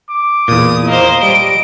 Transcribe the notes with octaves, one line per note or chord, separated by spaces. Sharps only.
D6
E2 A#2 D#6
A#3 C5 D#5
G3 D7